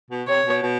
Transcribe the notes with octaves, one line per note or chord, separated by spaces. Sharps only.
B2
C3 C#5
B2
B2